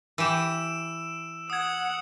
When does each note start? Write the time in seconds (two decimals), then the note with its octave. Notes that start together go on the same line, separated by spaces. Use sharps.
0.18 E3 G4 E6 D7 E7
1.50 F#5 D#6 G#6